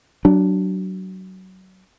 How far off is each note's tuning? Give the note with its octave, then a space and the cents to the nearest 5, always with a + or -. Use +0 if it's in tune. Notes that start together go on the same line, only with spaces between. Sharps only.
F#3 +25 D4 +0